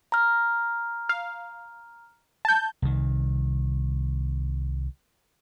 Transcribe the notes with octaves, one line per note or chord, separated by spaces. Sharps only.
A#5 F6
F5
A5 G6
C2 D#3